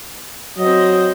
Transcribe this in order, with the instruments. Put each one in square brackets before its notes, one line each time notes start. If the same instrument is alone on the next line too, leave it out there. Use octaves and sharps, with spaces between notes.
[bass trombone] F#3 [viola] C4 D#5